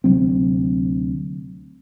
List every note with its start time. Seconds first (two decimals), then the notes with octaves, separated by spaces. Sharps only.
0.04 D2 C3 F#3 C4